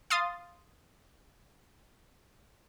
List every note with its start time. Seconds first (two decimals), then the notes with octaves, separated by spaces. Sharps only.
0.10 F5 C6 D#6 A6